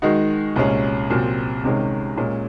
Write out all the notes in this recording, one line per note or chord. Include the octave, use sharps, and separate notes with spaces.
D#3 G#3 D#4 F#4
C2 A#2 G#3 C#4
C2 A#2 F#3 C4
C2 C3 D#3 G#3 C#4
A#2 G#3 C#4